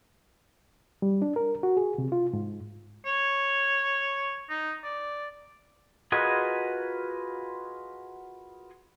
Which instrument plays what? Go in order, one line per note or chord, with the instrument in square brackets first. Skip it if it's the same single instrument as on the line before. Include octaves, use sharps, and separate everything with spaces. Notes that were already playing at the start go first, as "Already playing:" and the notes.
[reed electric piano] G3
D4
A#4
F#4
G#4
C3
F4
G#2
[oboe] C#5
D#4
D5
[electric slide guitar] F4 F#4 G#4 A#4 B4 D#5